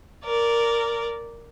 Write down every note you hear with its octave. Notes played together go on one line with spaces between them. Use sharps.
A#4 D5